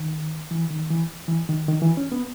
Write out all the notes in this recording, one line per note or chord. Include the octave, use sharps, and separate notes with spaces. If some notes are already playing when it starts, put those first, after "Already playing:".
Already playing: D#3
E3
D#3
E3
E3
D#3
D#3
E3
C#4
B3